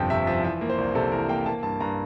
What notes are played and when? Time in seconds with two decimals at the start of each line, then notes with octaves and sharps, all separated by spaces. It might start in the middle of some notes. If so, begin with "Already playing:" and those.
Already playing: G1 F2 C3 F3 G5 A5
0.10 C3 E5
0.27 F3 E5
0.44 E3 E5
0.61 A#3
0.70 C5
0.78 C2
0.95 C3 A4
1.12 E3 A#4
1.29 A#3 G5
1.46 A#3 A5
1.63 G2 A5
1.80 G2 A#5